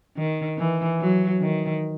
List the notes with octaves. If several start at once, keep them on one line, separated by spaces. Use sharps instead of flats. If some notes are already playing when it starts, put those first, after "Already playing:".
D#3
E3
F#3
D#3